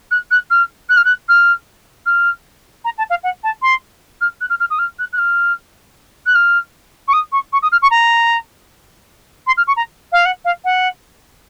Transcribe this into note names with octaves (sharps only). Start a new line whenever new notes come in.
F#6
F#6
F6
F#6
F6
F#6
F6
F6
A#5
A5
F5
F#5
A5
C6
F6
F#6
F6
F6
D#6
F6
F#6
F#6
F6
F#6
F6
C#6
D#6
C#6
C#6
D#6
F6
C#6
A#5
C6
F6
C#6
A#5
F5
F#5
F5
F#5